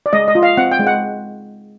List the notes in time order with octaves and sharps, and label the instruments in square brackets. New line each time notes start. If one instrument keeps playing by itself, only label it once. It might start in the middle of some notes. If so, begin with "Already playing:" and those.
[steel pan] D5
G#3 D#5
D#5
F4
F5
C4 F#5
G5
G#3
F#5